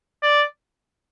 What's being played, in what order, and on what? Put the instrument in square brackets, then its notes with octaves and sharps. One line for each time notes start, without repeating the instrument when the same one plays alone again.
[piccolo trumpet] D5